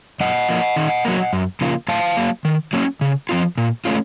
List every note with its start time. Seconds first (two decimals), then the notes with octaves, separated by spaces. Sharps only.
0.20 F#2 D#5 F#5
0.49 F3 A#3
0.76 D#3
1.05 F#3 A#3
1.33 F#2
1.61 C#3 F3 A#3 F4
1.88 A2 F5 A5
2.17 F#3 A#3
2.45 D#3
2.73 F#3 A#3 C#4
3.01 C#3
3.29 F3 C4 F4
3.58 A#2
3.85 A3 C#4 F4